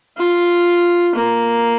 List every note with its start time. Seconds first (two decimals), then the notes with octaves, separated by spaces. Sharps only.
0.17 F4
1.15 A#3